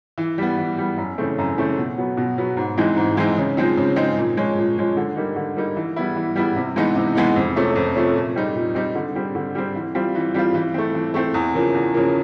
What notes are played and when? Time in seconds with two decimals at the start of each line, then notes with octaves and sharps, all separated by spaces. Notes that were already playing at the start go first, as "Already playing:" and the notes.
0.18 E3
0.38 G3 B3
0.58 E3
0.78 G3 B3
0.97 F#2
1.18 C#3 E3 A3 C4
1.38 F#2
1.58 C#3 E3 A3 C4
1.77 B2
1.98 F#3 B3
2.17 B2
2.38 F#3 B3
2.57 G#2
2.78 E3 G#3 C4 D#4
2.97 G#2
3.17 E3 G#3 C4 D#4
3.38 C#3
3.57 F3 G#3 C4 D#4
3.77 C#3
3.96 F3 G#3 C4 D#4
4.17 A#2
4.37 F3 G#3 C#4
4.57 A#2
4.77 F3 G#3 C#4
4.97 D3
5.16 G3 A#3 D#4
5.36 D3
5.56 G3 A#3 D#4
5.76 E3
5.96 G3 B3 E4
6.16 E3
6.36 G3 B3 E4
6.56 C3
6.76 E3 G#3 B3 D#4
6.96 C3
7.15 E3 G#3 B3 D#4
7.36 F2
7.56 C3 F3 A3 C#4
7.75 F2
7.95 C3 F3 A3 C#4
8.15 A#2
8.36 G3 C4 D#4
8.55 A#2
8.75 G3 C4 D#4
8.95 D3
9.15 G3 C4
9.35 D3
9.55 G3 C4
9.76 E3
9.95 G3 C4 F4
10.15 E3
10.34 G3 C4 F4
10.54 E3
10.74 A3 C4
10.94 E3
11.14 A3 C4
11.34 E2
11.55 C#3 F3 A#3
11.74 E2
11.94 C#3 F3 A#3